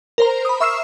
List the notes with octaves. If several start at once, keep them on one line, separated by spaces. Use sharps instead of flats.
A#4 C5 A#5
B5 D#6
E5 C#6 E6 F6 C7 E7